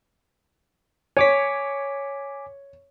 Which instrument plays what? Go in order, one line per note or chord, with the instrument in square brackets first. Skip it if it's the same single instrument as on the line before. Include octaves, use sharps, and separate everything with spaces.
[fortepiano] C#5 [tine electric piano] G#5 D6 B6